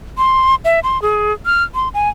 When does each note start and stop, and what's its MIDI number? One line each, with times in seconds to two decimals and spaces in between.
0.18 0.55 84
0.65 0.80 76
0.83 1.01 84
1.02 1.32 68
1.46 1.63 89
1.75 1.89 84
1.94 2.09 80